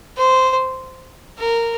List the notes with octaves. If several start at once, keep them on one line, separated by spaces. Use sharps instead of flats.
C5
A#4